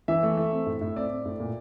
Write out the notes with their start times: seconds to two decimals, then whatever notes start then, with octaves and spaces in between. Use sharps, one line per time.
0.08 E3 E5
0.23 A3
0.37 A3
0.52 C4
0.66 A2
0.81 A2
0.96 C4 D5
1.10 C4
1.25 A2
1.40 A#2